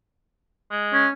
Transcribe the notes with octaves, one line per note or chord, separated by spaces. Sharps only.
G#3
C#4